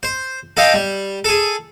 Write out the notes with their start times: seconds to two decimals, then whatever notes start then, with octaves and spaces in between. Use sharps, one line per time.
0.03 C5
0.57 A4 D#5 F5 G5
0.74 G3
1.24 G#4 A4